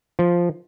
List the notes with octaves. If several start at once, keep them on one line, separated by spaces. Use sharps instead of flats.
F3